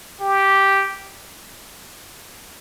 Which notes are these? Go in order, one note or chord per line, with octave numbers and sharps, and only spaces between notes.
G4